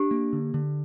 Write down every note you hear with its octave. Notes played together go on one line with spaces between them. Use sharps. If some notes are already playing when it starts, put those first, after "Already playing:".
Already playing: D4 G4
A#3
D3
D3